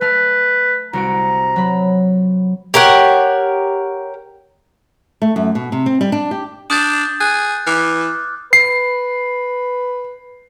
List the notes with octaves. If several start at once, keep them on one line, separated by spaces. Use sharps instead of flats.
A3 B4 A5 F6
C2 F#4 A#5 D7
F#3 B5
G4 A#4 C#5 F#5
A3
F#2
B2
C3
C4
G3
D4
G4
D4 D#6 G6 A6
G#4 F#6
E3 D6 F6 F#6
B4 C7